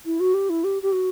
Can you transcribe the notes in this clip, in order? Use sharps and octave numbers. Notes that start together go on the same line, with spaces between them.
E4
F#4
G4
E4
G4
G4
F#4